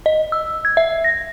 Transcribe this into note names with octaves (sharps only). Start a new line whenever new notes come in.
D#5
E6
G#6
E5
A#6